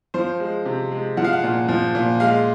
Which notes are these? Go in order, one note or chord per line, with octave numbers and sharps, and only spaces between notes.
F3 C5
G#3
C3
G#3
F3 F#5
F5
F#5
A#2
F3
A#2
G#3 F5